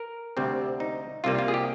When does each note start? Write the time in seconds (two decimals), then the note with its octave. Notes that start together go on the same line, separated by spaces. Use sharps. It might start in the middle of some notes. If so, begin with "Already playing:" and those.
Already playing: A#4
0.37 D2 C3 G3 C4
0.80 D#4
1.24 C2 C3 G3 A#3 F4
1.38 F4
1.48 G#4
1.54 G4